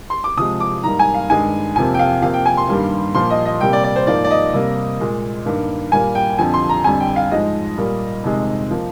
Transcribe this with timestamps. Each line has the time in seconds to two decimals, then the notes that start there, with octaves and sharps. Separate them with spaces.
0.10 C6
0.24 D6
0.37 C3 F3 G#3 D#6
0.60 D6
0.84 G#2 G3 A#3 A#5
0.99 G#5
1.14 F5
1.30 G2 D#3 G#3 G#5
1.76 F2 C3 F3 A#3 G#5
1.94 G5
1.99 F5
2.22 C3 F3 A#3 F5
2.34 G5
2.46 G#5
2.57 C6
2.69 G2 D#3 G3 A#3
3.15 A#2 F3 A#3 C6
3.31 D#5
3.46 D#5
3.61 C3 G3 A#3 G5
3.73 D5
3.84 D5
3.96 C5
4.07 G#2 F3 A#3 D5
4.24 D5
4.31 D#5
4.53 C3 G3 A#3
5.00 A#2 G#3
5.46 G2 D#3 A#3
5.92 A#2 G3 A#3 G#5
6.15 G5
6.39 F2 D3 F3 G#5
6.54 C6
6.69 A#5
6.84 F2 D3 G3 G#5
7.00 G5
7.16 F5
7.31 G#2 F3 G#3 D#5
7.78 A#2 G3 A#3
8.24 F2 C3 D#3 G#3
8.71 F3 A#3